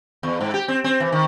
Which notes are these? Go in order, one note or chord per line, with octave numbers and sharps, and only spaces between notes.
E2
G#2
G4
C4
C4
E3
D#3